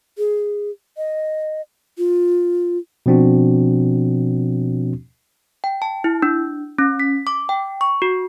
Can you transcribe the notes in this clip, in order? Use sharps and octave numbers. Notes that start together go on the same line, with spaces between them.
G#4
D#5
F4
B2 F3 C4 D4 F#4
G5
A5
E4
D4
C#4
B6
D6
G5
C#6
F#4